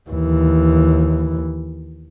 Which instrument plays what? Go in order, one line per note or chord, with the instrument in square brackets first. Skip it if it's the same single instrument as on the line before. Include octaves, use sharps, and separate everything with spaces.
[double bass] D#2 E3